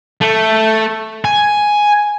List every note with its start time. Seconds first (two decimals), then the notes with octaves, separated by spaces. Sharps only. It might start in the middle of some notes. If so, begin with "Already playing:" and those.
0.22 A3
1.25 G#5